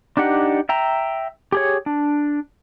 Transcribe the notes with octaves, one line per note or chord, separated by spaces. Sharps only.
D4 D#4 G4 F#5
E5 G5 A#5
G4 G#4 C#5
D4